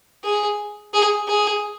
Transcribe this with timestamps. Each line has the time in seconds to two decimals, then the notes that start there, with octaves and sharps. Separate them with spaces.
0.24 G#4
0.94 G#4
1.28 G#4